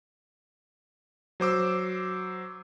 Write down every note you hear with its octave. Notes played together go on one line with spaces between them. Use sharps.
F#3 C5 D6 E6